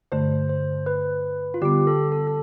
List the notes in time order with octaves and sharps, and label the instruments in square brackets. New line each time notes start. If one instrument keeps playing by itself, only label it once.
[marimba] G2 D3 A3 [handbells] C5
[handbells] C5
B4
F4
[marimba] D3 G3 B3 [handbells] G4
[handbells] A4
A4
A4